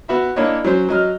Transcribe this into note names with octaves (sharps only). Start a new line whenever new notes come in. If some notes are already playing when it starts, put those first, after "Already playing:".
B3 F#4 E5 B5
A#3 D4 E4 C#5 D#5
F#3 C#4 C5
F#3 D#5 F6